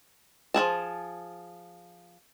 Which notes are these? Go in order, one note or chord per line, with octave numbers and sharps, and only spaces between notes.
F3 E4 G#4 A5